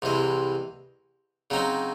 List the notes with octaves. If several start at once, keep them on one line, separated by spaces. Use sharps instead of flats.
C2 C3 E3 G#3
C#3 F#3 C4 D#4